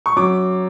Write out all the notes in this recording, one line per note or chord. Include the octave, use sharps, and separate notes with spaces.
C#6
F#2 D6